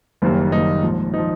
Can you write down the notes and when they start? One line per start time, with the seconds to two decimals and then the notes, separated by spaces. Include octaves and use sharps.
0.22 F#1 F#2 D#3 G3 A#3
0.52 F#1 F#2 D#3 G3 A#3 D#4
0.83 A#1 G#2 F3
1.14 F3 D#4